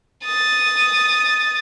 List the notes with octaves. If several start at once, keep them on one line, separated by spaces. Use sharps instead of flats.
D#6 A6